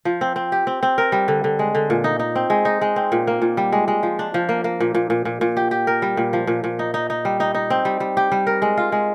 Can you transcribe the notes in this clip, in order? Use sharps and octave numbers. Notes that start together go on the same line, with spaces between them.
F3
C4
C4
G4
C4
C4
A#4
G3
D3
D3
G#3
D3
A#2
D#4
D#4
C4
G#3
D#4
G#3
C4
A#2
A#3
A#2
G3
G#3
G#3
F3
D4
F3
A#3
A#3
A#2
A#2
A#2
A#2
A#2
G4
G4
A#4
G3
A#2
F3
A#2
A#2
D#4
D#4
D#4
G3
D#4
D#4
C4
G3
G3
G4
G3
A#4
G#3
F4
G#3